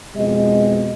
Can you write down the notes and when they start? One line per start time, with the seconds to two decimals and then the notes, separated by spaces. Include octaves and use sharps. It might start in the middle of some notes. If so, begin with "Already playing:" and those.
0.16 F2 B2 G#3 D#5